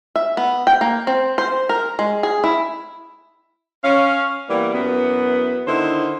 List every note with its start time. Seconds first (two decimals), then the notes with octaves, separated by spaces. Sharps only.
0.16 E5
0.37 B3
0.67 G5
0.81 A#3
1.07 C4
1.38 C5
1.69 A#4
1.99 G#3
2.23 G#4
2.44 E4
3.83 C#4 F5
4.49 E3 G3 A#3 B3
4.74 F#2 E3 B3
5.67 D3 D#3 E4 C5